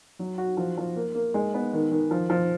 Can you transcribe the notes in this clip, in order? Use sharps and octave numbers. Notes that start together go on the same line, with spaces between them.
F#3
F#4
F3
F3
A#3
A#3
G#3
B3
D#3
D#3
F3
F3